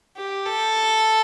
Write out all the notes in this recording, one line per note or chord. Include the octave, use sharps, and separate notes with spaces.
G4
A4